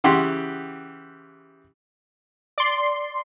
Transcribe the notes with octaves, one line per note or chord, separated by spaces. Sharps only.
C#3 E3 G4 F#5 C6
D5 C6